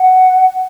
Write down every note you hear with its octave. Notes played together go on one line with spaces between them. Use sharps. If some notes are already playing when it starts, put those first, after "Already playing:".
Already playing: F#5